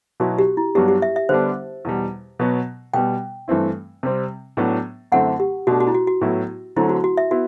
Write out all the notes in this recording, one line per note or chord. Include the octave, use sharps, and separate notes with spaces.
B2 F#3 B3 E4 F#4
G4
E4
G2 F#3 B3 D4 G4
G4
E5
E5
D3 G3 B3 D4 C5
E2 B2 G3
B2 F#3 B3
B2 G3 B3 G5
G2 E3 A3 C4 E4
C3 G3 C4
A2 F#3 B3 D4
F#2 D3 A3 C4 E4 F#5
G4
B2 A3 D4 F#4
F#4
E4
F#4
F#4
A2 F#3 B3 E4
D3 F#3 A3 C4 E4
F#4
F#4
E5
B3 E4 F#4